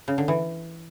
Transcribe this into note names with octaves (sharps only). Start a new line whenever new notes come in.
C#3
D3
E3